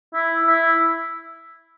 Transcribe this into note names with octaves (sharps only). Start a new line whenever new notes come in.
E4
E4